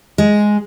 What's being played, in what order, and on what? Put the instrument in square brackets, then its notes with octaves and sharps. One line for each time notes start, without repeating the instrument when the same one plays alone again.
[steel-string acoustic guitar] G#3